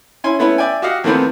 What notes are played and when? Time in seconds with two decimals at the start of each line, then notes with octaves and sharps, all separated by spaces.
0.24 C#4 E4 G#5 C6
0.39 A3 B3 C#4 E4
0.58 D5 E5 G5 G#5
0.82 F#4 G4 D#5 F5 F#5
1.04 E2 D#3 F3 A3 B3 C4